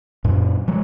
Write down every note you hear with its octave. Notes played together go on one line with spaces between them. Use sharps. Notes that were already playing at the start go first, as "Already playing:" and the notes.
F#2 A#2
F3 G#3